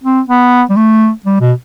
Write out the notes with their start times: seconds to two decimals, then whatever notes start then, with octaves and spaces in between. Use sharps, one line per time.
0.04 C4
0.28 B3
0.70 G3
0.76 A3
1.25 G3
1.41 B2